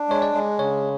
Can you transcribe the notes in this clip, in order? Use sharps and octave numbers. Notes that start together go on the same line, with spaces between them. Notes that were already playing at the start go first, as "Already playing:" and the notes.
Already playing: D4
G#3 C#5
D5
G#3
C#3 C#5